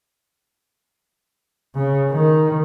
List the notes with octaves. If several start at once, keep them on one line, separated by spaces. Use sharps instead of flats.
C#3
D#3